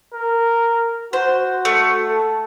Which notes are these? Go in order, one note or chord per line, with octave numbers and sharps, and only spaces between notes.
A#4
F#4 C5
A3
A4